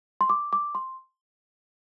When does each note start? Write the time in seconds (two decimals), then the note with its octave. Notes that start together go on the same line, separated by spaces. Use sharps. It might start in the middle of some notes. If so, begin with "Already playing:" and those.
0.21 C6
0.30 D6
0.53 D6
0.75 C6